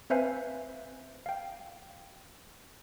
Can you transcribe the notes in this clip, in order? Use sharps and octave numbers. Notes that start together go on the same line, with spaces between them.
C4 B4 C5 E5 F5 G#5
F5 G5